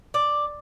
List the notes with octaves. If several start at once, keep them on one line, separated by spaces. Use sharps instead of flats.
D5